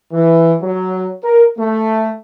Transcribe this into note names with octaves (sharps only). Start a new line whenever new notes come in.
E3
F#3
A#4
A3